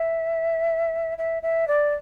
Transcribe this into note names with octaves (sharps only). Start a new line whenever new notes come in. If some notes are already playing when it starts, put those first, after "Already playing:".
Already playing: E5
E5
E5
D5